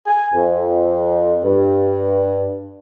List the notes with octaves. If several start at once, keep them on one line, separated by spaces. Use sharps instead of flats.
G#5
F2
G2